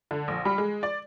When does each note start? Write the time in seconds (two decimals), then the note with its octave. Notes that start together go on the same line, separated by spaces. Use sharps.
0.11 D3
0.28 A#1
0.45 G3
0.58 G#3
0.83 D5